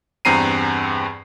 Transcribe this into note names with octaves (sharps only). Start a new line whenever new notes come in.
E2 G2 C4 A#5 C7 D#7